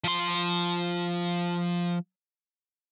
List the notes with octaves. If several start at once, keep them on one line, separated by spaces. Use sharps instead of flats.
F3 C6